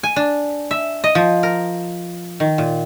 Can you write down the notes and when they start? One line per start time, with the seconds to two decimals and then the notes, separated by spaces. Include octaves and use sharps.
0.03 G#5
0.16 D4
0.71 E5
1.04 D#5
1.15 F3
1.43 A#4
2.40 D#3
2.58 A#2